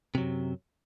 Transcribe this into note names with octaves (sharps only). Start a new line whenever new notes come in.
F#2 C3 F#3